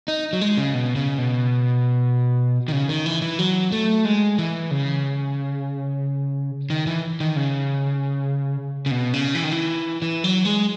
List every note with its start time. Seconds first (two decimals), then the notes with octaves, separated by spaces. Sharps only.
0.08 D#4
0.33 F#3
0.41 G#3
0.58 C#3
0.74 B2
0.96 C#3
1.18 B2
2.68 D#3
2.72 C#3
2.89 D#3
3.06 E3
3.22 E3
3.39 F#3
3.72 A3
4.05 G#3
4.38 E3
4.71 C#3
6.70 D#3
6.87 E3
7.20 D#3
7.36 C#3
8.86 C#3
8.91 B2
9.13 C#3
9.35 E3
9.43 D#3
9.51 E3
10.02 E3
10.24 F#3
10.45 G#3